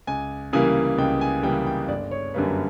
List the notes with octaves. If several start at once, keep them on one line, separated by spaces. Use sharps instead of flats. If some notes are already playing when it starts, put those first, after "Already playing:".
C#2 G#5
C#3 E3 G3 A#3 G#5
C#2 G5
G#5
C#3 E3 G3 A#3 G5
G5
G1 D5
C#5
F#2 D3 G3 A#3 B4